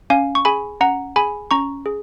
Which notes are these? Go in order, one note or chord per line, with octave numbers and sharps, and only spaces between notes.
C#4 F5 G#5
C#6
G#4 G#5 B5
C#4 F#5 A#5
G#4 G#5 B5
C#4 A#5 C#6
G#4